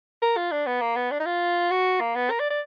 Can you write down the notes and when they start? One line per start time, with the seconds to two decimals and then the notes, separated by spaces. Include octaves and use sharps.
0.22 A#4
0.37 F4
0.52 D4
0.66 B3
0.81 A#3
0.96 B3
1.11 D4
1.20 D#4
1.26 F4
1.70 F#4
2.00 A#3
2.15 B3
2.30 A#4
2.40 D5
2.50 D5